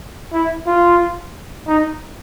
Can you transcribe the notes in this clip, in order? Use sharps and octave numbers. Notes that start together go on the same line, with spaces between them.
E4
F4
D#4